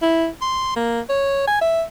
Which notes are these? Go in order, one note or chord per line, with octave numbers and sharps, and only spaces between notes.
E4
C6
A#3
C#5
G#5
E5